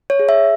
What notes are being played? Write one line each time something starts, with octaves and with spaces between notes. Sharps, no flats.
C#5
G#4
E5